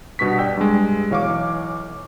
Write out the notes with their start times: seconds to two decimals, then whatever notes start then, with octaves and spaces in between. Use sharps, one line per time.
0.19 G2 B2 B3 C#6 B6
0.38 D5 G5 E6
0.57 G2 G#3
1.11 B1 E3 C#5 F5 C#6 D6